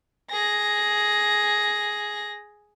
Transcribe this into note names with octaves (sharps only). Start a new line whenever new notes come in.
G#4 A#6